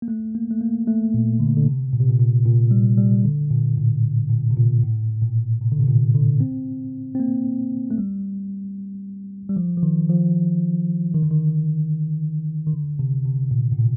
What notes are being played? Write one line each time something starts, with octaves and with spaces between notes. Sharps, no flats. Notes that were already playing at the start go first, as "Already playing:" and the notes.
A#3
A3
A#3
A3
A#3
A3
A#2
D3
D3
C3
A#2
C3
A#2
A#2
A#2
G3
G3
D3
A#2
A2
A#2
C3
A#2
A2
A#2
C3
D3
C3
A#2
D3
C4
C4
A#3
A3
G3
G3
F3
F3
D#3
F3
D#3
D3
D#3
D#3
D3
C3
C3
A#2
A2
A#2